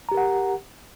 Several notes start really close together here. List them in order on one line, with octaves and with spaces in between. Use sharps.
A#5 G4 A#4 F#5